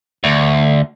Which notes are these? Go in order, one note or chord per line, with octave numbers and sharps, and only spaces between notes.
D2